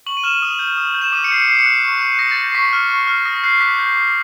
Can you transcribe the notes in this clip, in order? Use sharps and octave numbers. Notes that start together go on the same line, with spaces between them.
C#6 F#7
D#7
F6 E7
D#6
G6
D#6
G6
E7
D6 D#7
C#7
G6 C7
C#7
D6 C7
C#7
F#6 C7
C#6
F#6
D#6 A#6
A6
G6
A#6
C7
C#6 B6
F6
C#6
F6
D#6 A#6
F#6 C7
D6 B6
G6
D6